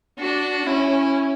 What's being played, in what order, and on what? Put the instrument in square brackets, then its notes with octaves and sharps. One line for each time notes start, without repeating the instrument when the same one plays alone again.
[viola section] D4 [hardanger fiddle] F#4
[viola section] C#4 [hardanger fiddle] E4